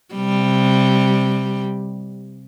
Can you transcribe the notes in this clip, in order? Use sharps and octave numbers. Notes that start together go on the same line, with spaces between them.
C3 G3